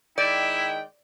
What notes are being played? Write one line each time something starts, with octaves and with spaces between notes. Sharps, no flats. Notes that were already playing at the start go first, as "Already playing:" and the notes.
D#3 G#3 E4 D5 G5